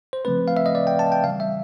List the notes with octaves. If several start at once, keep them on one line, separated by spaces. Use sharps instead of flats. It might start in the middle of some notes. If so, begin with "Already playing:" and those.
C5
C#3 F3 A3 C4 B4
F5
E5
D#5
D5
G5
A5
G5
C#3 E3 G3 F5
E5